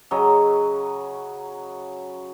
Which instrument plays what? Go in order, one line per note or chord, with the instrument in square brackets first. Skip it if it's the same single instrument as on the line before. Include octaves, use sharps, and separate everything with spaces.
[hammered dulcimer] C#3 F#3 C#5 D#5